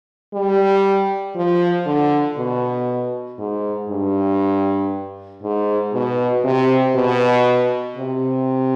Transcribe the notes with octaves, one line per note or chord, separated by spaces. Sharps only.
G3
F3
D3
B2
G#2
G2
G#2
B2
C3
B2
C3